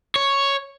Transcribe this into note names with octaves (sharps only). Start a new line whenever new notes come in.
C#5